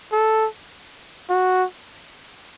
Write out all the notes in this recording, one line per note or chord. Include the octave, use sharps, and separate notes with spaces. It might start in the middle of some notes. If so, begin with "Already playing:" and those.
A4
F#4